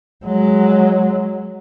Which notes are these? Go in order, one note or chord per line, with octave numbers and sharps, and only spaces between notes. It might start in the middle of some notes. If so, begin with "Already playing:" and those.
F#3 G#3